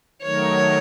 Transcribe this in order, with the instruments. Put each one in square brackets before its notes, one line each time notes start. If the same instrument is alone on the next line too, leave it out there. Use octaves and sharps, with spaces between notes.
[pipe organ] D#3 F#3 A3 D#4 A#4 [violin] C#5